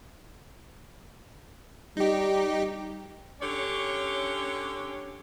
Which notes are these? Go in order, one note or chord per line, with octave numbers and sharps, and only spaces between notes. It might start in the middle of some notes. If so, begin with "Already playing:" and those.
G3 D#4 G4
D3 C#4 G4 C#5